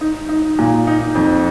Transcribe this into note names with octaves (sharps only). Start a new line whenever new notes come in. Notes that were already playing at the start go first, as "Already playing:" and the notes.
D#4
D#4
A#2
D#4
F2